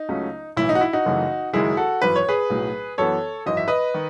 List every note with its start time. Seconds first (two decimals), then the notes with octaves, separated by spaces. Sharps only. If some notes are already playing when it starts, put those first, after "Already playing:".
Already playing: D#4
0.08 C#2 C#3 F#3 A3 C#4
0.57 B1 A2 E3 E4
0.69 D#4
0.75 F#4
0.81 E4
0.93 D#4 F#4
1.05 F#1 F#2 C#3 E3 A3
1.53 F#1 F#2 D#3 G#3 E4 G#4
1.77 F#4 A4
2.02 G#1 F#2 E3 B4
2.16 C#5
2.28 G#4 B4
2.50 B1 A2 F#3
2.98 F#2 E3 B3 A4 C#5
3.46 G#1 F#2 E3 D#5
3.57 E5
3.68 B4 D#5
3.94 D#3